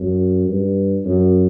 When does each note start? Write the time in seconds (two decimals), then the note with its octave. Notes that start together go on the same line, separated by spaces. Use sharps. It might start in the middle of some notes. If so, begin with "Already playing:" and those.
Already playing: F#2
0.48 G2
1.05 F#2